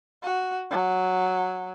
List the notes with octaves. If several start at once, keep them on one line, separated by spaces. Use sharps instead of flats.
F#4
F#3